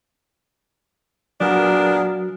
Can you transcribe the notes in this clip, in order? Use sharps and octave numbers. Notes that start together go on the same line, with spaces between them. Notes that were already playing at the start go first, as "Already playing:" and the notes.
A#2 F#3 B3 D4 F#4 G#4 A#4